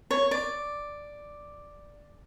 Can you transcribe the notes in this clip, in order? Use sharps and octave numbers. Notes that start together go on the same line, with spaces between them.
C#5
D5